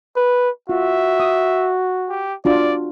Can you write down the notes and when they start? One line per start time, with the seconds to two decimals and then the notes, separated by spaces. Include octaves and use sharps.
0.17 B4
0.69 F4 F#4 E5
1.20 D#6
2.09 G4
2.45 D4 F4 F#4 D5